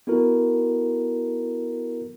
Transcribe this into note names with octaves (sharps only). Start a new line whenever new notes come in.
B3 E4 F#4 A4 A#4